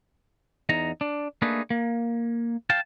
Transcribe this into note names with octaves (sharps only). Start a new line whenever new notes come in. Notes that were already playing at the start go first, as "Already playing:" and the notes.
E2 D#4 A#5
D4
A3 A#3 D4 D#4 G#4 B4
A#3
F5 G5 A5